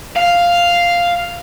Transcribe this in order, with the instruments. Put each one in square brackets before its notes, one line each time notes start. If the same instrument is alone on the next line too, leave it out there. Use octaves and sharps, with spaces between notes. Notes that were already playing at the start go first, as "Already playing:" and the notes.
[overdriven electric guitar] F5